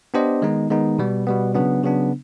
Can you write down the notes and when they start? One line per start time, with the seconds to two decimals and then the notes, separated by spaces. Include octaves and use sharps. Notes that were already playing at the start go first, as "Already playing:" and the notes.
0.14 B3 D4 G4 C5 D#5
0.42 D#3 G#3 B3 D#4
0.70 D#3 G#3 B3 D#4
0.99 B2 G3 B3
1.27 B2 G3 B3
1.54 C#3 F#3 B3 D4
1.83 C#3 F#3 B3 D4